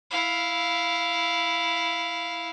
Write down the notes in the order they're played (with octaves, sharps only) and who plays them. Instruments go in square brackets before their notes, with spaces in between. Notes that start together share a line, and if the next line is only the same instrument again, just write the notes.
[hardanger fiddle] E4 F5